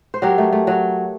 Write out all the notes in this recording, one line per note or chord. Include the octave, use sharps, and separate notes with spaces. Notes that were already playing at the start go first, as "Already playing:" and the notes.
C5
F#3 G4 A#4
A3
A3
F#3